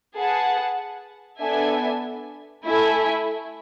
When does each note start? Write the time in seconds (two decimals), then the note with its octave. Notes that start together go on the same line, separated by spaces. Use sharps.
0.14 G#4 B4 F#5 A5
1.40 B3 D4 A4 E5 G#5
2.67 A3 E4 A4 E5 G#5